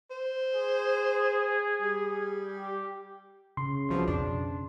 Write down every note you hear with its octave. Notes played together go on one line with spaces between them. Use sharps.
C5
G#4
G3
G4
C#3 C6
C2 B2 F3
F2 B2 D4